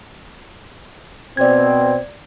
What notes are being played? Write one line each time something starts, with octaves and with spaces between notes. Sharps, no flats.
B2 C4 D5 G#6